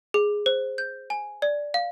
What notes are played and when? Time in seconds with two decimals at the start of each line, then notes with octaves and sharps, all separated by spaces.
0.14 G#4
0.46 C5
0.78 G6
1.10 G#5
1.42 D5
1.74 F5